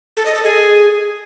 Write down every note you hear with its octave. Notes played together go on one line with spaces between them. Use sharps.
A4
D#5
A4
G#4